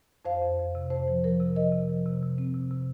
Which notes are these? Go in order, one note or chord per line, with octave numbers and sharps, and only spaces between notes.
F2 C5 F5
F2
F2
C3
F2 C5
F3
F3 A#4
C3
F3 A#4 D#5
C3
F3
C3
C3
C4
C3
C3